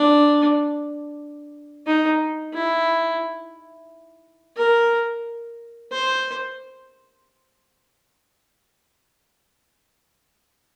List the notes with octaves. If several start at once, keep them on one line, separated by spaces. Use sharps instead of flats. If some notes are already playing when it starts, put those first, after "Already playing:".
Already playing: D4
D#4
E4
A#4
C5